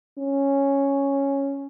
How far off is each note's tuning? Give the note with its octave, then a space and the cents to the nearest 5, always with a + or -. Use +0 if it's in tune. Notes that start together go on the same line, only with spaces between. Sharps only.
C#4 -5